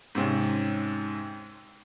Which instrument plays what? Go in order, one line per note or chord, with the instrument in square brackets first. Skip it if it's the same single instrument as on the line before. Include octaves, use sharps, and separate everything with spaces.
[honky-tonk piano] G#2 C3 C4 C#4